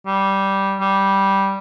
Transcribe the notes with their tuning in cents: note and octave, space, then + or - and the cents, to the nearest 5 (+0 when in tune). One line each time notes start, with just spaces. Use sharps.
G3 -10
G3 -5